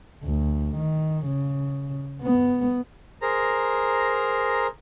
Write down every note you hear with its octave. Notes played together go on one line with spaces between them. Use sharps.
D2
D#3
C#3
B3
G#4 A#4 C5 A#5